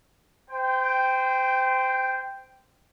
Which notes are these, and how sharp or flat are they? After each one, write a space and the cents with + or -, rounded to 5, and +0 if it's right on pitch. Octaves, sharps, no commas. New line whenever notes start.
C5 -25 G5 +0